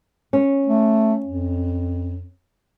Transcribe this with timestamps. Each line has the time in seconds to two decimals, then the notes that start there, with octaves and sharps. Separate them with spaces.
0.33 C#4
0.67 A3
1.26 F2